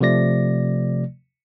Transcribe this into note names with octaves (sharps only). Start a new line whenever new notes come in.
C3 F3 A3 D5 A#6